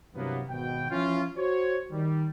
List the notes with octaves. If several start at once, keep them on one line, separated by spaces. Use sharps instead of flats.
G2 C3 E3 F#3 A#3 B3
G#1 B2 G5
E3 F3 C#4 E4 F4
F#4 C5 C#5
D#3 G3